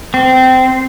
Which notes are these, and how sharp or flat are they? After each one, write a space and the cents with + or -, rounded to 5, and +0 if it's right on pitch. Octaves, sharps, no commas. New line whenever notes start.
C4 -20